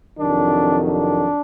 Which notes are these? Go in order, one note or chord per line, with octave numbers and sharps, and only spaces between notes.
F2 C3 D#3 F#3 D4
D4